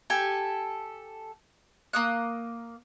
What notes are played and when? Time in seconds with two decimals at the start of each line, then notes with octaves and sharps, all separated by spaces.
0.10 G4 A4 G#5
1.93 A#3 D#6 F#6